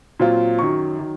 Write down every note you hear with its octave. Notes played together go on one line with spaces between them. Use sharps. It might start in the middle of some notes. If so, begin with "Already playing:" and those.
A#2 F#3 C4 F4
F#2 D#3 F#3 C#6
D#3 F#3